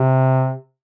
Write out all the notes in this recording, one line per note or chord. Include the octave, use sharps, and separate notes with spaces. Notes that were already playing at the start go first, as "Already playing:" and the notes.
Already playing: C3